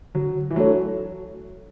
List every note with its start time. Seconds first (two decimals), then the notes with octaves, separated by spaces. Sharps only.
0.15 D3 F#3
0.51 E3
0.56 F#3 A3 D4 A4 C#5